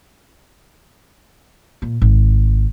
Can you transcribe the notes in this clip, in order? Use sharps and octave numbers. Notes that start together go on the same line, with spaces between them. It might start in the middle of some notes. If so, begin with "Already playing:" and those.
A#2
G#1